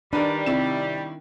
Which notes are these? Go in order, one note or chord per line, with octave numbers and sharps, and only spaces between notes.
D#3 G3 D4 A#4 B4
C3 D#3 E4 E7